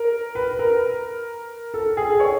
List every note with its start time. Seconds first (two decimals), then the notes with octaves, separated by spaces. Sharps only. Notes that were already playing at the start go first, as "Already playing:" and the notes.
Already playing: A#4
0.35 B4
0.59 A#4
1.74 A4
1.97 G#4
2.20 C#5